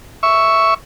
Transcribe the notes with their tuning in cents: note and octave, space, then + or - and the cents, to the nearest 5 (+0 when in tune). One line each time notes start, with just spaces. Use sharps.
E5 +0 C#6 +5